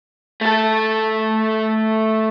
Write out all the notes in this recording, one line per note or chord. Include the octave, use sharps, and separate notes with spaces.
A3 A4